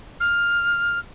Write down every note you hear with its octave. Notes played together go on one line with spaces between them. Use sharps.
F6